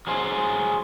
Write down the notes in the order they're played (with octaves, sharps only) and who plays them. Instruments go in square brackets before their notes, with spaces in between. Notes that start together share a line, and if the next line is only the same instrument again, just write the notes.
[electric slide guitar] F#3 G#4 C5